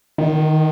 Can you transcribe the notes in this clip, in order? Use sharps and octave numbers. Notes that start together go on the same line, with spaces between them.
D#3